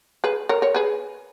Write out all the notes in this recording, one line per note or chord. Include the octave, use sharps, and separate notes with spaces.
G#4 B4
A#4 C#5
A#4 C#5
G#4 B4